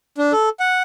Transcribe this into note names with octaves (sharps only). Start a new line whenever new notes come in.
D4
A4
F#5